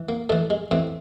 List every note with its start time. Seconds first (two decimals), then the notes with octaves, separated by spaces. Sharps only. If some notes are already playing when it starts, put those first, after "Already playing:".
Already playing: E3
0.09 A#3
0.29 A2 E3 A3
0.50 G#3
0.71 A2 E3 C4